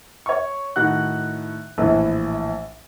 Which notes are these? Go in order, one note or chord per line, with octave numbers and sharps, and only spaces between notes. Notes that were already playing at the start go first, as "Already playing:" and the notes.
C#5 C#6
A2 D#3 F#4 F#5 F#6
A#1 A2 E3